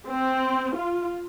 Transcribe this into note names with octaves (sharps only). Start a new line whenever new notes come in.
C4
F4